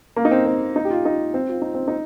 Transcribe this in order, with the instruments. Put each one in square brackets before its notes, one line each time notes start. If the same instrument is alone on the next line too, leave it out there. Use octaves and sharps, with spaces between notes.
[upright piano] A#3
D#4
C4
C4
D#4
G4
F4
D#4
C4
F4
D#4
C4
D#4